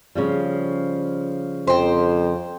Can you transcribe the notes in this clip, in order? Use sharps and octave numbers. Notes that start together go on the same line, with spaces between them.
C#3 F3 G3
F2 C5 G5